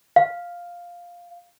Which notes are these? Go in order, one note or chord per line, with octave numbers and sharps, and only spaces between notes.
F5